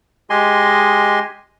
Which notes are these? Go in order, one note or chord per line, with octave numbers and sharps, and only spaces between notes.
G#3 G4 D#5 G#5 C6